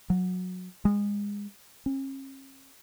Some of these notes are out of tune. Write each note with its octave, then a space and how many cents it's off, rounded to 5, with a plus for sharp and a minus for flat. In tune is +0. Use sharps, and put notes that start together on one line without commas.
F#3 -20
G#3 -25
C#4 -45